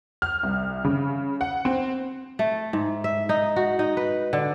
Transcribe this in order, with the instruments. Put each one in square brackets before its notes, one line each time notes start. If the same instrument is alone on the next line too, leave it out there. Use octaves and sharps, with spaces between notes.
[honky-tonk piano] F6
C2
C#3
F#5
C4
[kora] A3
G#2
E5
D#4
F#4
D#4
B4
D3